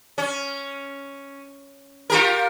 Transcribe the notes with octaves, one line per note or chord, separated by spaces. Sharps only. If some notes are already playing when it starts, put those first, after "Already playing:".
C#4
F4 G4 A#4